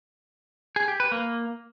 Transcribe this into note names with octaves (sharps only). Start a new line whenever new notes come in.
G#4
G4
B4
A#3